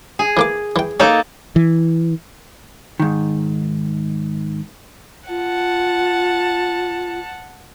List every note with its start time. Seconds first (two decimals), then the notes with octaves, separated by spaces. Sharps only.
0.19 G#4
0.37 E3 A#3 D6
0.76 E3 G5
1.00 A#3 C#4 D#4 A4
1.56 E3
3.00 G#2 D#3
5.29 F4 F#5 A5